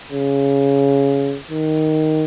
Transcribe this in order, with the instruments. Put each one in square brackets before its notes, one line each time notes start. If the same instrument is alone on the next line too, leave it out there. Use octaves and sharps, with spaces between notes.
[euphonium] C#3
D#3